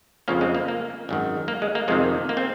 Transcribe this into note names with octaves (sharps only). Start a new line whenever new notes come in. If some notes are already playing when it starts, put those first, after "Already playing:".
F2 C#3 F3 A#3 C#4
G#3 C4
A#3
A#3
G#1 F#2 D#3
A#3
G#3
A#3
F2 C3 D#3 G#3 C4
A#3
C4